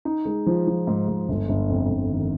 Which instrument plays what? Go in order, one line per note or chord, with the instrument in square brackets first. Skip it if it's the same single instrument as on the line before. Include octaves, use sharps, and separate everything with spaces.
[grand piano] D#4
G#3
F3
F3
G#2
G#2
G1
G1
F2
G1
D#3